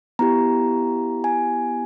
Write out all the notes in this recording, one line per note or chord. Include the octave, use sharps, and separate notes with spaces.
B3 E4 G4 A#5
G#5